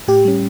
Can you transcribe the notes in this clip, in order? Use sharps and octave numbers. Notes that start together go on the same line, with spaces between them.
A2 G4
G3 C#4